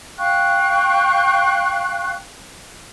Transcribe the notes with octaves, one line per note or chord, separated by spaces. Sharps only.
F5 G5 C#6 F#6